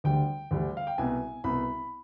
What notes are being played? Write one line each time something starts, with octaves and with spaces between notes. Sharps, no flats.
D2 D3 G3 G5
D2 D3 G3
F5
G5
C2 B2 B3 G#5
C2 B2 B3 B5